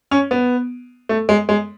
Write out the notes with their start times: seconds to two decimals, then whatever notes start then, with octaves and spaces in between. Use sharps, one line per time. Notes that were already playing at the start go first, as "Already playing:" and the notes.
0.11 C#4
0.31 B3
1.09 A3
1.29 G#3
1.49 G#3